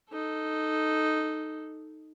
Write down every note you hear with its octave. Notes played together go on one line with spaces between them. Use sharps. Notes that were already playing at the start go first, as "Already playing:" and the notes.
D#4 A4